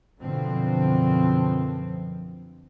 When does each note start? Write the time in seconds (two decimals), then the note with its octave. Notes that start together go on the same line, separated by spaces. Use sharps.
0.20 F#2 B2 D3 F3 C4